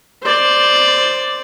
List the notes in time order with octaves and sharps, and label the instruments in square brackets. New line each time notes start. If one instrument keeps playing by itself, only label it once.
[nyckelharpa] C5 D5